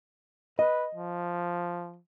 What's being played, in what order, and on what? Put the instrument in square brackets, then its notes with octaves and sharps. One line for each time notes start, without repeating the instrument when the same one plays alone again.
[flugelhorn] B4 [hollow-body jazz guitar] D#5
[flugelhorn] F3